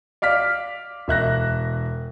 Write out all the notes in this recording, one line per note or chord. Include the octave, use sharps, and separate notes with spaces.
D5 F5 F6 B6
E1 E5 F#6 A#6